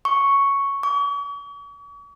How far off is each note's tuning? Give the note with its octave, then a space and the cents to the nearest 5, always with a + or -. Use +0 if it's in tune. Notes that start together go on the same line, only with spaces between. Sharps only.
C#6 +0
C#6 +45